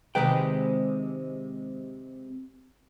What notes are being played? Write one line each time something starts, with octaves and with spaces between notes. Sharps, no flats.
C3 D#3 G#3 B4 G5